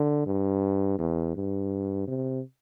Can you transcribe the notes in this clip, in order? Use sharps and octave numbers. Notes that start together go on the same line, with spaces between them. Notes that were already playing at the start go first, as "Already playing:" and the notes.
Already playing: D3
G2
E2
G2
C3